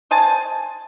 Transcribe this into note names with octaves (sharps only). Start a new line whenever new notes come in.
C5 D#5 G#5 A5